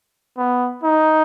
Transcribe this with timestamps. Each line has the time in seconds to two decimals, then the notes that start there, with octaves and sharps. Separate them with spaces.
0.37 B3
0.84 D#4